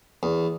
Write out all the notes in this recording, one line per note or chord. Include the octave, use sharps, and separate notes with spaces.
E2